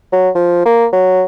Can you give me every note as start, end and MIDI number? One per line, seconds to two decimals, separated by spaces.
0.12 0.30 54
0.35 0.62 53
0.66 0.86 58
0.92 1.24 54